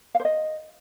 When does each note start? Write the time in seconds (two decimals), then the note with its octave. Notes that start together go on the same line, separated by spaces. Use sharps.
0.15 F5
0.20 C5
0.25 D#5